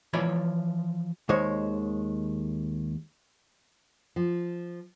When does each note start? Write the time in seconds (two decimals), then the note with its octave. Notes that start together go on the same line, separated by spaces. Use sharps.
0.13 E3 F3 C#5 D5 B5
1.29 D#2 D#3 G#3 C5 C#5
4.16 F3